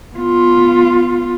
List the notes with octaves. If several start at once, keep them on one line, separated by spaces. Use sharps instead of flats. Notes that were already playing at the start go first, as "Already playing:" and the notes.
B3 F4